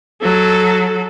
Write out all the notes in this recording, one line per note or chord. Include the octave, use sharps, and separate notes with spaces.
F#3 A4